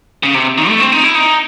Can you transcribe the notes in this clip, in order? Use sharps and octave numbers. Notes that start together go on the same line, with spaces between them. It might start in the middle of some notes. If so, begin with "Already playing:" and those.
C#3
C3
D#3
A3
C4
D#4
E4
D#4